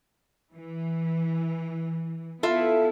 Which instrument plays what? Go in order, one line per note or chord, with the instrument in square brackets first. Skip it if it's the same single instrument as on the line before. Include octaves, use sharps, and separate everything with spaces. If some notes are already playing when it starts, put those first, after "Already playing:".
[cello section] E3
[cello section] B3 E4 [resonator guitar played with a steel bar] F4 A4 E5